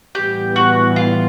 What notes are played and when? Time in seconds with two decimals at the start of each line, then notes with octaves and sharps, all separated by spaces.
0.15 A2 E3 G3 B3 G4
0.56 F#4
0.96 F4